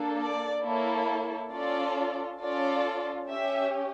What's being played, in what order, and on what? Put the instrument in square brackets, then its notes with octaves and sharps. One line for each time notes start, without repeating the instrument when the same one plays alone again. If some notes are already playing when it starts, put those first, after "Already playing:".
Already playing: [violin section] A#3 D4 A4
D5
A#3 E4 A4 C#5
C#4 F4 A4 D5
C#4 F4 A4 D5
C#4 G4 E5